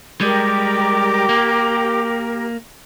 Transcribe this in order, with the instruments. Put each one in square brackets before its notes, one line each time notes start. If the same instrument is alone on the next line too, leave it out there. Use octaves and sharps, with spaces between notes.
[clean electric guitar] G3 G#3 [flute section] G4 A#4 [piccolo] D6
[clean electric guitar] A#3